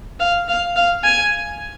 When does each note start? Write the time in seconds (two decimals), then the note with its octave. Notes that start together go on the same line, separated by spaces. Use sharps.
0.20 F5
0.48 F5
0.76 F5
1.04 G#5